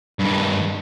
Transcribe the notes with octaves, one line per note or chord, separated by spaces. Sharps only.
G2 D#3